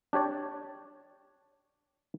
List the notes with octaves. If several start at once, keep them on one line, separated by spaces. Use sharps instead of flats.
D4 G4 C#5 D5